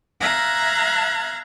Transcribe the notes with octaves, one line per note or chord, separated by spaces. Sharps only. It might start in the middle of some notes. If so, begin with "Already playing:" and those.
E5 F5 A#5 F#6 G#6 A#6